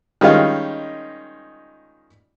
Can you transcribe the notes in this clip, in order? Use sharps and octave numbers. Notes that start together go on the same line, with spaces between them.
D#3 G3 G#3 C#4 D#4 F4